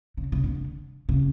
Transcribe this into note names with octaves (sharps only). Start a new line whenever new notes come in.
C#3
C#3
D3
C#3